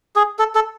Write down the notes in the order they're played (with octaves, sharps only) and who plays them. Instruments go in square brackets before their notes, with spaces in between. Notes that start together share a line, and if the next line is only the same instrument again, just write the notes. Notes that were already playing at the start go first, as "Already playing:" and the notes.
[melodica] G#4
A4
A4